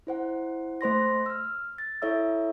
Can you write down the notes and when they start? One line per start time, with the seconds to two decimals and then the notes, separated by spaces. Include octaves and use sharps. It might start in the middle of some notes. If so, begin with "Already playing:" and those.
0.07 E4 C5 F#5
0.81 A3 C5 C6 A#6
1.26 E6 F6
1.78 A6
2.02 E4 A4 C#5 E5 E6